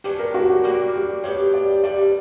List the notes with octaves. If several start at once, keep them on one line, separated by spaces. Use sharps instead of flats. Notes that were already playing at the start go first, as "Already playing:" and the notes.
C#3 F#3 B3 D4 G4
A#4
F#4
G4
G3 A#3 D4 F#4
G4
G3 B3 D4 G4 C#5
D5
D3 G3 B3 D5